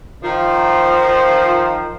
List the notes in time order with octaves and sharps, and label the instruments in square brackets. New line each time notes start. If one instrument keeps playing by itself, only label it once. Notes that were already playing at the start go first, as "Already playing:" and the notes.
[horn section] D#3 F3